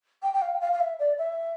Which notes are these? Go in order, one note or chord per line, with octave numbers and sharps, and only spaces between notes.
G5
G5
F5
G5
F5
F5
E5
D5
E5